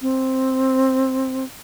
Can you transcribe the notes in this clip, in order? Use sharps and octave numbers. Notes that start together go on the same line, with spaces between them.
C4